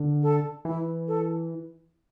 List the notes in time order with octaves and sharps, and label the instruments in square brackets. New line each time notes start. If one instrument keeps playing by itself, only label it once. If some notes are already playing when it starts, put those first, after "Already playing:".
Already playing: [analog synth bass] D3
[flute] A4
[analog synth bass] E3 [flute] E4
[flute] A4